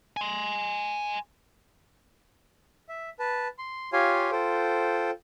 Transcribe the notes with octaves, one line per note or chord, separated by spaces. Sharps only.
G#5 C6
E5
B4 A5
C6
F4 G4 C#5 F5 G#5 C6
F4 A4 C5 G5